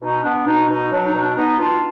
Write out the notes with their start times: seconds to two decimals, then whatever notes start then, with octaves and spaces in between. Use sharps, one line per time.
0.01 B2 D#4
0.23 B3 D4
0.46 B2 D#4
0.68 B2 D#4
0.90 F#3 D4
1.06 D#4
1.13 B2
1.20 D4
1.36 B3 D#4
1.58 B2 D4 F4